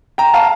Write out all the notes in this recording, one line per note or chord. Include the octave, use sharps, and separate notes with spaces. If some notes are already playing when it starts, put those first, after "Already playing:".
G5 A#5
F5 A5